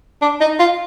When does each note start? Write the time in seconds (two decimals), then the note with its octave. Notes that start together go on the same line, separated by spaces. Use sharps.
0.22 D4
0.41 D#4
0.59 F4